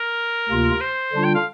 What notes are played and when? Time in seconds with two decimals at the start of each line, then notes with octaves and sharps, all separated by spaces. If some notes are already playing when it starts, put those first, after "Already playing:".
Already playing: A#4
0.49 D2 C3 A#3 F4
0.81 C5
1.13 D3 G3 D4 F4
1.25 G5
1.35 F5